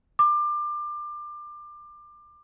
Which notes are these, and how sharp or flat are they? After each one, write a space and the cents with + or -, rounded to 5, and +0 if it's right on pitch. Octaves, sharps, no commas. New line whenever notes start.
D6 +25